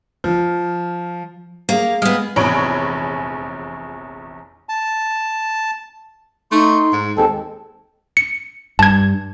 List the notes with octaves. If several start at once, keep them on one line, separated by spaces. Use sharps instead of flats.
F3
A#3 G#4 F5
G#3 B3 D#6 F6
F1 A#1 E2 C#5 B5 D7
A5
A3 D#4 C6
G#2
D#2 G#3 C4 A4 A5
C#7
G2 A5 G#6